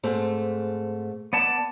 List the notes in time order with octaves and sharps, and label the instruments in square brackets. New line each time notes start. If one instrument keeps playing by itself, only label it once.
[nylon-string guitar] G#2 A3 C4
[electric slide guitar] B3 D5 A5